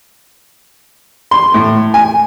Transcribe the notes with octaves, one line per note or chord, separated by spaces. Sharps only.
C6
A2
G#5